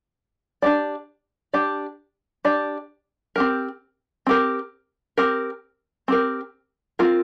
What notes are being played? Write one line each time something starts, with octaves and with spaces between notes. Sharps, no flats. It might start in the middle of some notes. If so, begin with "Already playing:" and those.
D4 G4 D5
D4 G4 D5
D4 G4 D5
C4 G4 A#4
C4 G4 A#4
C4 G4 A#4
C4 G4 A#4
C4 F4 A#4